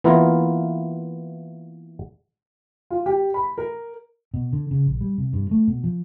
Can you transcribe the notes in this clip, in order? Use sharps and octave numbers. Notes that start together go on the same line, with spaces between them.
E3 A#3 B3 E4 F4 A#4
F4
G4
B5
A#4
B2
D3
C#3
A#1
G3
C3
G2
A3
B2
F3